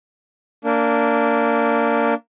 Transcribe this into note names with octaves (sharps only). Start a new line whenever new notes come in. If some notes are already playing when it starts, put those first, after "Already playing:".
A#3 D4